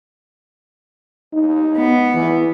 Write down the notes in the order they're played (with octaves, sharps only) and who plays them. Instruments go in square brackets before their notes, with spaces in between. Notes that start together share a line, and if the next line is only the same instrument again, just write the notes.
[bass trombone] D#4
[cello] B3
[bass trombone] E3